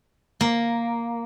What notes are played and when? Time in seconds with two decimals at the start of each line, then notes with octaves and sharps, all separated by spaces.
0.41 A#3